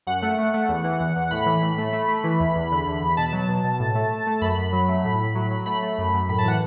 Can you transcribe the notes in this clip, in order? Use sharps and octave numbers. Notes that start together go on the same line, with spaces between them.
F#2 F#5
A3
A3
A3
E2
E3
E2
E2
A2 B5
E3
A2
A3
A3
A3
E3
E2
E2
D3
E2
E2
B2 A5
F#3
B2
B2
A2
A3
A3
A3
F#2 B5
F#2
F#3
A3
A2
A2
F#3
F#3
A3 B5
A3
F#2
F#2
A2 B5
A5
E3 F#5